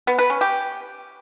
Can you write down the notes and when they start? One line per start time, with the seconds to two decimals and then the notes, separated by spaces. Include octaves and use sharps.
0.07 B3
0.19 B4
0.30 C#4
0.41 G4